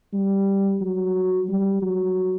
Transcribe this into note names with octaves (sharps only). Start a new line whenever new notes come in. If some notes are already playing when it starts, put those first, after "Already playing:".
G3
F#3
G3
F#3